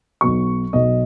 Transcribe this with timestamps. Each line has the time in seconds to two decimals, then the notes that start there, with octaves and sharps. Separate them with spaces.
0.21 B1 B2 F#3 C#6
0.73 B1 B2 F#3 D#5